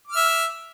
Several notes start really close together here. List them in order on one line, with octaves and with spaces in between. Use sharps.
D6 F6 E5